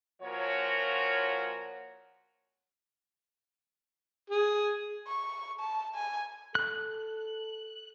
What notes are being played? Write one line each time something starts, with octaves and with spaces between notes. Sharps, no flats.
A#2 F3 F#4 A#4 C#5
G#4
C#6
A5
G#5
A4 F#6